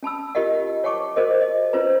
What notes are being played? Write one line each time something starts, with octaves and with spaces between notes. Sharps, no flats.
C#4 A5 B5 E6
F4 G4 A#4 D#5 F5 F#5
C#5 F#5 G5 A5 C#6 D6
F#4 G#4 A#4 C5 D#5
D#5
C#4 F4 B4 C5 A#5